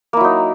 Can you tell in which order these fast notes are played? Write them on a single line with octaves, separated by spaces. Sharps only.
A#3 E4 F#3 D#4